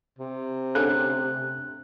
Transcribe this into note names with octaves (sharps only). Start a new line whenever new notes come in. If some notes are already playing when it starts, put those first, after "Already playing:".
C3
D3 A3 C#4 F#6